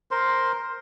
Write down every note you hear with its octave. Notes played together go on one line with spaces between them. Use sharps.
A#4 C5 C6